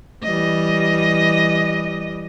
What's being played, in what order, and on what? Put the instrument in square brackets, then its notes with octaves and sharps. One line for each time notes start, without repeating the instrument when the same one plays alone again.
[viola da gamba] E3 G3 D#5